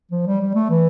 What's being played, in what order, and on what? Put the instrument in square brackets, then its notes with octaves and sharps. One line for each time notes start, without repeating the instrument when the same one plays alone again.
[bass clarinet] F3
G3
G3
A3
E3